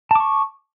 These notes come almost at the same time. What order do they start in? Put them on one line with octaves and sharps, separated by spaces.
A5 D6 C#6